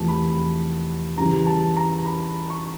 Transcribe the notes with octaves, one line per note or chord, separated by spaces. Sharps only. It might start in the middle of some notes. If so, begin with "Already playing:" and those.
Already playing: E2 C3 F3 A3 A5
B5
C#3 E3 G3 A#5
A5
A#5
B5
C#6